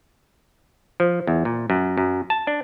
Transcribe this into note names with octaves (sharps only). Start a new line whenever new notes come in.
F3
E2
A#2
F#2
F#2
A5
D4